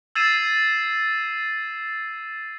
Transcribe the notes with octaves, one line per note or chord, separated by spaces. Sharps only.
E6 G#6 A6 C7 D#7 E7